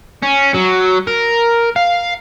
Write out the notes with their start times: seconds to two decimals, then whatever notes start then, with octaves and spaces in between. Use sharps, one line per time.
0.23 C#4
0.54 F#3
1.07 A#4
1.76 F5